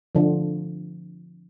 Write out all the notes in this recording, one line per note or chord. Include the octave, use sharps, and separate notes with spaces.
D3 F3